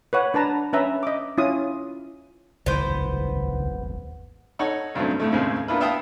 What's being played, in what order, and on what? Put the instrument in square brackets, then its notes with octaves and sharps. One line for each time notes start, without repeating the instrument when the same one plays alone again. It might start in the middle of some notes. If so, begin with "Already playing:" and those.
[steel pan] B4 C#5 F#5
D4 B4 A5 A#5
C#4 B4 E5 A#5
D#5 D6
C#4 E4 F4 D#6
[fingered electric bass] D#1 G#1 [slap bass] C#2 E3 [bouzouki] B3 C5
[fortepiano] D#4 A4 C#5 F#5 C#6
C#2 G2 C#3 F#3 A3 C4
F2 A2 A3
D#2 A2 C#3 G#3 C4
A#3 B3 D4 E4 F4 B4
B3 E5 F5 G5 A5 D#6